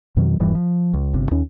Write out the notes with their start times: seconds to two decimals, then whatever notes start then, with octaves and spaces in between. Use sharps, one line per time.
0.17 F2 B2 D#3 F#3
0.40 D#1 G2 E3 G3
0.55 F3
0.94 C#2
1.14 G1 C3
1.31 D#2 C#4